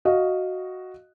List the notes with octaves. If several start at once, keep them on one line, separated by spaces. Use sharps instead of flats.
F#4 D#5 F5